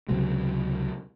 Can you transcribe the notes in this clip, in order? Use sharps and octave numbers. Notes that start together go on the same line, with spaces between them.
C#2 C3 F#3 G#3